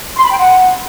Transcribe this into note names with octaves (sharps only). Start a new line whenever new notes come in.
C6
B5
G5
F#5